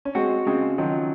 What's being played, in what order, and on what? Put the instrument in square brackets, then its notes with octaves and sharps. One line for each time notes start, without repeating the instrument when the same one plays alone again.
[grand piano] C#4
[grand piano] G#3 C4 [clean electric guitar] F#4
[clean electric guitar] C#3 [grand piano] G#3 C4
[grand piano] D#3 F#3 [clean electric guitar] F3